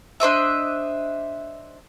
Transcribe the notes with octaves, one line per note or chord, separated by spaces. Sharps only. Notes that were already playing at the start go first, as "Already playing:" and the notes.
D4 C5 D#5 E5